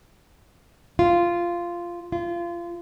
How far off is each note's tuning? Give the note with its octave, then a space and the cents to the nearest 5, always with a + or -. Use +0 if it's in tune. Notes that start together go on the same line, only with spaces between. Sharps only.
F4 -10
F4 -25